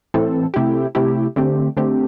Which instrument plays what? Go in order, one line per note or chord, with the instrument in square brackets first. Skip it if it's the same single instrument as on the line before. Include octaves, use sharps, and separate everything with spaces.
[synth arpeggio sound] A2 E3 C4 A4
C3 A3 E4 G4
C3 A3 E4 G4
D3 A3 C4 G4
D3 A3 C4 G4